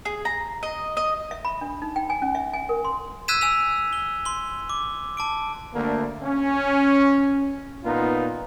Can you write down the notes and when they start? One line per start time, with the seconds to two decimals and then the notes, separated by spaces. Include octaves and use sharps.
0.05 G#4
0.25 A#5
0.63 D#5
0.97 D#5
1.31 E5
1.45 B5
1.61 D4
1.82 D#4
1.96 G5
2.10 G#5
2.22 C#4
2.35 E5
2.53 G#5
2.69 A#4
2.84 C6
3.28 E6 F#6 G#6 B6 D#7 E7
3.41 G#5 E6 B6 F7
3.93 G7
4.25 C6 G7
4.70 D6
5.17 A5 D6 D7
5.73 D2 D3 A3 A#3
6.23 C#4
7.84 A#2 B3 D#4 F4